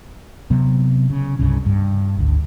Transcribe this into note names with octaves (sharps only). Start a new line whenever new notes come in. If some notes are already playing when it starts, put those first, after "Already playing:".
C3 F#3 B3
C#3
C2 G2 C#3
G2
G#1 D2